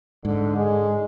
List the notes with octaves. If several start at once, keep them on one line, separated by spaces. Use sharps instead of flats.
G#2 D3
G#3